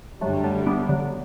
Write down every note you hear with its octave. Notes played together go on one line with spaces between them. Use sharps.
F#2 D3 F#3 G3 A3
F#3 A3
B3 D4
D3 F#3